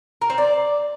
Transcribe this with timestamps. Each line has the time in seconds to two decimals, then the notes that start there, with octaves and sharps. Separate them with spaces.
0.21 A#4
0.30 C4
0.38 D5